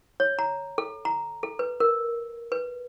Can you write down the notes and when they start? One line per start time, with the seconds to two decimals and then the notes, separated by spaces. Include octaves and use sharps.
0.20 C#5
0.39 A#5
0.78 A4
1.05 A#5
1.43 A4
1.59 B4
1.80 A#4
2.52 B4